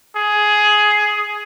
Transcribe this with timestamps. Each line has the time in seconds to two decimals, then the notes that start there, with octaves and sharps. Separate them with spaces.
0.16 G#4